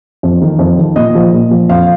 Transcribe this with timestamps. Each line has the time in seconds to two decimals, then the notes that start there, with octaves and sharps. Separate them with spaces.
0.23 F2
0.41 D#3
0.59 F2
0.78 D#3
0.96 A#2 D#5
1.15 F3
1.33 A#2
1.51 F3
1.69 F2 F5